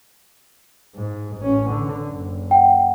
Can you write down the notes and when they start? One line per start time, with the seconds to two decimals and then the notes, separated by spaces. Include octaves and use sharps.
0.95 G#2
1.38 A1 C#4
1.70 D3
2.05 F#1
2.51 F#5 G5